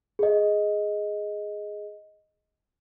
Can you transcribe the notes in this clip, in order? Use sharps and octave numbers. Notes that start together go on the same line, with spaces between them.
G#4 D#5